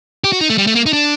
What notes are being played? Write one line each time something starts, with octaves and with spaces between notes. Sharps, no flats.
G4
F#4
D#4
A3
G3
A3
A#3
D#4
D4